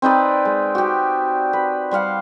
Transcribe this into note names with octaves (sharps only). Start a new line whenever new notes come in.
C4 D#4 B4 D5
G#3
F#4 G4
B4
G3 C5 F5 F#5